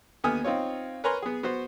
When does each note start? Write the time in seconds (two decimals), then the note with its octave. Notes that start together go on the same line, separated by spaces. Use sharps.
0.24 D#2 D3 B3 G#5 D#6 F6
0.44 C4 D#4 F4 C#5
1.04 A#4 B4 C#5 G#5 A#5 C6
1.22 B3 G#4
1.43 B3 F#4 C5